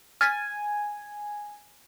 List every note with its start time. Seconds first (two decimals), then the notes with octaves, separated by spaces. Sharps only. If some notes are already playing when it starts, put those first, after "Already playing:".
0.21 G#5 F6 A6 B6